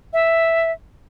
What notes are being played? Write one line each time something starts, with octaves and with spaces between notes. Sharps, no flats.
E5